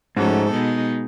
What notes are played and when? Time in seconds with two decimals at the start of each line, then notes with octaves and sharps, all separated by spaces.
0.17 G#2 F3 A3 C#4 F#4 A4
0.50 B2 G#3 B3 D#4